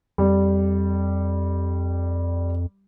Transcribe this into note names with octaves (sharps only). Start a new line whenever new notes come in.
F2 G3